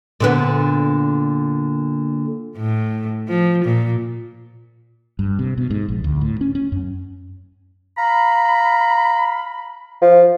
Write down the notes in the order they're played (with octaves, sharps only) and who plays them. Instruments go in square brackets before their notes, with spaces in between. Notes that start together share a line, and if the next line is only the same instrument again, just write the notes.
[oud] A#2 D3 B3
[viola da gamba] A2
F3
A#2
[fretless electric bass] G2
C3
B2
G#2
A#1
D2
A2
C#4
C#4
F#2
[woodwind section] F5 A#5 B5
[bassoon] F3